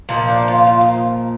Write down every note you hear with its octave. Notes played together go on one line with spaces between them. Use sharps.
A#2 F3 A#3 D#4
D4
F4
F4
D#4